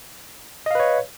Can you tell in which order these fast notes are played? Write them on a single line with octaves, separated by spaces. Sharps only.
D#5 F5 B4 C#5